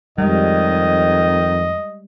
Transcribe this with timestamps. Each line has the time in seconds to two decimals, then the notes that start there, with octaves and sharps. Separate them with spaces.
0.18 F2 D#3 G3 G#3 D#5